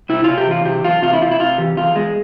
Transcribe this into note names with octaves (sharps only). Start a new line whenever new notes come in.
C3 E4
C3 F4
G4
E3 F4
C3 G4
E2 F4
C3 F4
E4
C3 F4
E4
C3 F4
E3 G4
E2 F4
E2 G#3